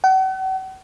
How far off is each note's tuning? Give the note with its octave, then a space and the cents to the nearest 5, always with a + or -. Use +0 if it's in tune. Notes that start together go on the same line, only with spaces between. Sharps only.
F#5 +40